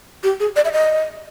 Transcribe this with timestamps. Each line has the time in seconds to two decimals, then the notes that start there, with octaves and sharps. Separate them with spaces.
0.23 G4
0.40 G#4
0.56 D5
0.65 E5
0.72 D#5